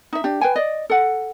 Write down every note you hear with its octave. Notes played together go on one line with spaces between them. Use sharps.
D#4 E5
D4 G4
B4 G5 G#5
D5 D#5
A4 F#5